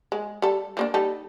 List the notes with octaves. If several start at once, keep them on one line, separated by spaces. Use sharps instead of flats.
G#3
G3 A4
F3 A#3 D4
G3 D#4 A4